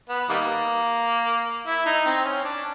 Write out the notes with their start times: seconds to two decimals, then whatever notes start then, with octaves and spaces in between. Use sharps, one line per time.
0.09 B3
0.29 D#3 G3 A#3
1.66 E4
1.86 D#4
2.06 C4
2.25 C#4
2.45 D4